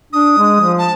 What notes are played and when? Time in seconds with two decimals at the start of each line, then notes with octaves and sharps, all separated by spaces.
0.13 D4 D#6
0.37 G#3
0.60 F3
0.78 A5